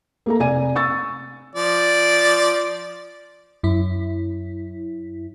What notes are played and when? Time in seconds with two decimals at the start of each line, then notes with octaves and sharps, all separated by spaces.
0.26 A#3 A4 A#5
0.39 F1 D5 G#5 D#7
0.76 C#6 E6 A6
1.55 F3 D5
3.63 F#2 E4